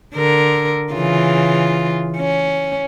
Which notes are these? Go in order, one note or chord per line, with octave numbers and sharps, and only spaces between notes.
D3 A#4
C#3 E3 F4
C#4